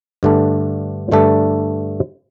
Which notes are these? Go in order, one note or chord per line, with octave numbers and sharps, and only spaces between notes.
G2 D3 A3 D4 A4
G2 D3 A3 D4 A4